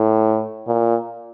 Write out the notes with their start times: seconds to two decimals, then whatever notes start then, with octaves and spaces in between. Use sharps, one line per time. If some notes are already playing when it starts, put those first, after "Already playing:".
Already playing: A2
0.67 A#2